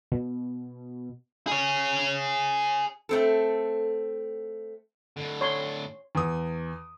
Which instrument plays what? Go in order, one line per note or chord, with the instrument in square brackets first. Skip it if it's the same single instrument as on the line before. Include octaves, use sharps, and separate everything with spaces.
[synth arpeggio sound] B2
[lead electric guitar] G#4 C#5
[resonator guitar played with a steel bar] A3 C4 A4
[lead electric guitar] A2 D3
[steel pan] C#5 C6
[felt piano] E2 D#6